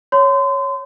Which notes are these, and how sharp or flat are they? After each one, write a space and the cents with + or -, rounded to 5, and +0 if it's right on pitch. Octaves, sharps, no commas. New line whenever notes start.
C#5 +0 C6 -35